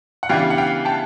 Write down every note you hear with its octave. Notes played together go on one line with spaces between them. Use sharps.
F#5
C#3 E3 G3 B3 D4 F5 G5
F#5
F5 G5
G5 A5